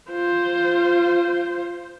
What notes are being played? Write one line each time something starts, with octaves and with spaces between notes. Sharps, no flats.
F4 C5